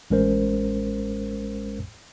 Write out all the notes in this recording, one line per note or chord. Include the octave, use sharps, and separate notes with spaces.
A1 G#3 C#4 A#4 C5